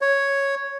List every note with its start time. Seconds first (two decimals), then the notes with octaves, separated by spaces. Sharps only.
0.01 C#5